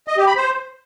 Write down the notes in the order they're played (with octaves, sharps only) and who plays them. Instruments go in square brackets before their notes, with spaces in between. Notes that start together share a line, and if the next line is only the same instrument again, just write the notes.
[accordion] D#5
G4
B5
C5